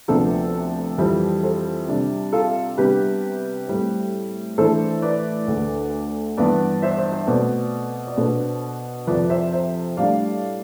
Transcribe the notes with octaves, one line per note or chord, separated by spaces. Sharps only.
D2 C3 F3 B3 D4 A4 C5
F2 E3 G3 C4
A4 C5
C3 G3 D4
F4 A4
C3 G3 B3 D4 G4 B4
A2 G3 C4
A2 E3 A3 D4 A4 C5
B4 D5
D2 D3 A3
G2 E3 B3 D4 B4 D5
C5 E5
C5 E5
C5 E5
B2 A3 C4 B4 D5
D5
B2 B3 D4 A4 C5
F2 C3 F3 B4 D5
C5 E5
C5 E5
A2 G3 D4 D5 F5